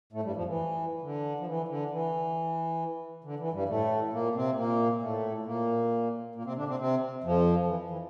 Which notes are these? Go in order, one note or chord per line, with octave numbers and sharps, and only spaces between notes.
A2 A3
G2 G3
F2 F3
E3
D3
F3
E3
D3
E3
D3
E3
G2 G3
A2 A3
A#2 A#3
C3 C4
A#2 A#3
A2 A3
A#2 A#3
A#2 A#3
C3 C4
D3 D4
C3 C4
C3 C4
F2 F3
E3
E3